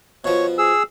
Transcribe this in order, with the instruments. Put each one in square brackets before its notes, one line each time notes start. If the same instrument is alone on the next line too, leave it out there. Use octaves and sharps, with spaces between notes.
[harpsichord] B2 F3 [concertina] C#5
[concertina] G#4 E6